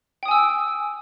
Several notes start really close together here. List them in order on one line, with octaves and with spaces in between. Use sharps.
G5 D#6 G#5 E6